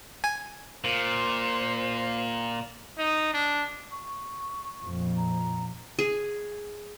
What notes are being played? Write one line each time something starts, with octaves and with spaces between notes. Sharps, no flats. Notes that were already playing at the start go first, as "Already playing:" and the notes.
G#5
A#2 C5
D#4
D4
C#6
F2 A#2
A#5
G#4